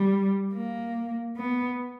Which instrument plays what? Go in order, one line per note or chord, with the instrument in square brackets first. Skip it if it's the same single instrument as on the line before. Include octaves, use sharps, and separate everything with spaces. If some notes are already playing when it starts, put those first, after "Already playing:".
Already playing: [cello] G3
A#3
B3